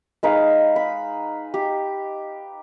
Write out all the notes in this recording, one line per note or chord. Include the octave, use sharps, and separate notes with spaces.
G#3 D#4 B4 F5
B5
G4